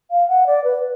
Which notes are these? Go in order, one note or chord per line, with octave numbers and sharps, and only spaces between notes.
F5
F#5
D5
B4